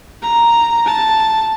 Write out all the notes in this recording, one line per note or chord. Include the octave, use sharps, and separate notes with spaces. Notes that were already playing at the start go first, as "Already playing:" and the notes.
A#5
A5